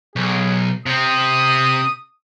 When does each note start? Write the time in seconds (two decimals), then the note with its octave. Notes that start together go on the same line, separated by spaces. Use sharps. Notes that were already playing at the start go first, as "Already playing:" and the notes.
0.16 B1 G#4
0.86 C3 C4 D#6